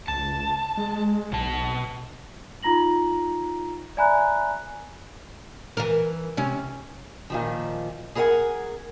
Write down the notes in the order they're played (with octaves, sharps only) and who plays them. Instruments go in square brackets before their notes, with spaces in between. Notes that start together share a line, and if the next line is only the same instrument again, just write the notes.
[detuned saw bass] C#2 [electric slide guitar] A5
[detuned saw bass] G#3
[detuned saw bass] B1 [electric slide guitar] B2 A5
[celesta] D#4 F4 A#5 A#6 F#7
D5 E5 G#5 A#5 B5 F#6
[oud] E3 A#4
C3 C#4
[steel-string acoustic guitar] A#2 D#3 F3
G#4 A#4 C5 E5 F#5 G#5